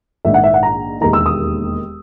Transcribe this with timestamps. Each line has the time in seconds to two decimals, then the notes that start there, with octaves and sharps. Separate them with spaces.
0.25 A#1 G#2 D#3 E5
0.34 F#5
0.44 E5
0.54 F#5
0.63 A#5
1.01 E1 D#2 D#3 A#5
1.13 E6
1.26 D#6